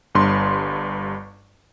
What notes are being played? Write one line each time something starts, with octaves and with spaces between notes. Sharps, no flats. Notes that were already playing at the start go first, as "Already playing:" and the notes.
G1 G2 C6